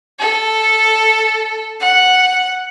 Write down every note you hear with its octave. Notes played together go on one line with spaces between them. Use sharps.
A4
F#5